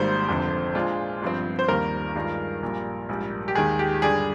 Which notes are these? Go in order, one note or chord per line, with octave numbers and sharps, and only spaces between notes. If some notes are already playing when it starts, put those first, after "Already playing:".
Already playing: G#1 G#2 D#3 G3 A#3 C5
F1 F2 D3
A#2 G#3 D4 F4
G1 G2 F3 C4
C5
D#2 D#3 G3 A#3 A#4
G2 D#3 G#3 D4 F4
A#1 A#2 G3
A#1 G#2 G3
G4
D#2 D#3 G#3 G#4
G4
G2 D3 G3 D4 G#4